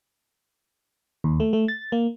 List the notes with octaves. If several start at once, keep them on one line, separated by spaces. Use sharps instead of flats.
D#2
A3
A3
A6
A#3